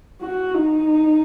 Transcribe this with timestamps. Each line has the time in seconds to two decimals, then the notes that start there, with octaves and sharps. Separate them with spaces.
0.22 F#4
0.54 D#4